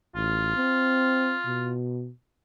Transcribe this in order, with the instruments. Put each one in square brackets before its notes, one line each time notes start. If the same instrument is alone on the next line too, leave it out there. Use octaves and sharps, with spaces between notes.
[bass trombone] A1 [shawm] F4
[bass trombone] C4
B2